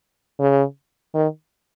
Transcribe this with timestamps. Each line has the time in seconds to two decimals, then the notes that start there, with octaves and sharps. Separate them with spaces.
0.40 C#3
1.15 D#3